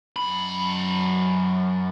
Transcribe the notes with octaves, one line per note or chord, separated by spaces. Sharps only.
F#2 B5